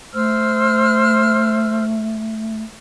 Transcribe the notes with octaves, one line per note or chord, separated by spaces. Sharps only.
A3 C5 E6 F6